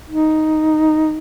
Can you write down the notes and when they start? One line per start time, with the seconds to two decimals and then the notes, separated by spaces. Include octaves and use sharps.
0.09 D#4